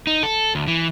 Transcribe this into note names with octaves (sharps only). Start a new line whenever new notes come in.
D#4
A4
D2
E3